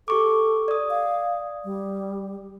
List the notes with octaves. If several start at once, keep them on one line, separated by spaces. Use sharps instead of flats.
G4 A4 C#6 D6
D5 D#6
F5
G3